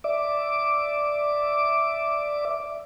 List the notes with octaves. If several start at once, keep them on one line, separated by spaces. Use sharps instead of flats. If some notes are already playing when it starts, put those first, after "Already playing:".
D5 E5 D6